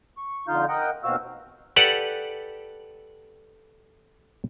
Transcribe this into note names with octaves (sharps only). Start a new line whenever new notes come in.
C#6
F2 D3 D#4 F4 F5 G6
A#4 D#5 F#5 G5
D#2 B2 C4 F#4 F5 E6
G4 A4 B4 D5 F#5